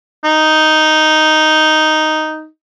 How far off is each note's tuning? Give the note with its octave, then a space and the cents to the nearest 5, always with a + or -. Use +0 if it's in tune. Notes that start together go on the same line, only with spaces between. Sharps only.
D#4 +0